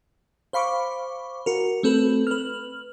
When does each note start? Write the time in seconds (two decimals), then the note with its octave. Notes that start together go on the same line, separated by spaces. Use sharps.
0.53 C5 F5 B5 C#6 D6
1.46 F#4 A#4
1.83 A3 C4 A4 B4
2.27 B4 F6